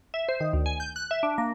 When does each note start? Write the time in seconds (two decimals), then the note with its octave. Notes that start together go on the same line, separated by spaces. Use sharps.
0.14 E5
0.29 C5
0.40 D#3
0.53 D2
0.66 G#5
0.80 G6
0.96 F#6
1.11 E5
1.23 D4
1.38 A#3